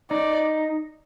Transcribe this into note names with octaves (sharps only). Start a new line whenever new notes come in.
D#4 D5